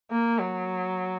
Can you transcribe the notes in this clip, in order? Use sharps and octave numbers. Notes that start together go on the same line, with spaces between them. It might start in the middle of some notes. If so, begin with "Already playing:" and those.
A#3
F#3